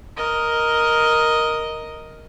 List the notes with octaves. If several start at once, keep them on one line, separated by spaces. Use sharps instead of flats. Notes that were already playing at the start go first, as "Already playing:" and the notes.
A#4 D#5